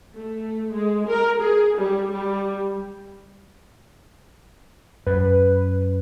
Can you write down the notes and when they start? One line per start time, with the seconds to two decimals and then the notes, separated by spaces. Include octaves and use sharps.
0.15 A3
0.73 G#3
1.08 A#4
1.41 G#4
1.78 G3
2.12 G3
5.06 F#2 B4